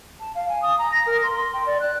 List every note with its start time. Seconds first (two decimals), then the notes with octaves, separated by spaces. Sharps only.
0.20 A5
0.35 F5
0.49 G#5
0.62 D#6
0.78 A#5
0.92 A#6
1.06 A#4
1.23 C6
1.37 C6
1.53 G5
1.66 D5
1.80 F#6